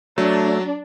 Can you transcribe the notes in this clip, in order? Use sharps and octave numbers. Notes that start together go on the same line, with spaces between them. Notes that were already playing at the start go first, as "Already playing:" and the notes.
F#3 A3 D4